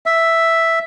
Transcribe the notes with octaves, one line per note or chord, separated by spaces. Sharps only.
E5